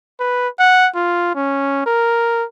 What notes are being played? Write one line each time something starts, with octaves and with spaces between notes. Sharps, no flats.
B4
F#5
F4
C#4
A#4